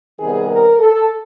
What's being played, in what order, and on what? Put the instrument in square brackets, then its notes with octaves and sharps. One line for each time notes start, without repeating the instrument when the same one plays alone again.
[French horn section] C3 D#3 G3 B3 G#4
A#4
A4